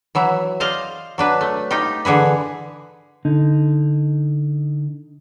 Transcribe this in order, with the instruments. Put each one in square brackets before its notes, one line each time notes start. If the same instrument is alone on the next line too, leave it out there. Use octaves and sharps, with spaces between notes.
[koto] E3 F#3 E5
C5 D5 D#5 F5
F#3 D4 B4
A3
D#4 F4 G4
D3 E3 G#4 B4
[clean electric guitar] D3 D#4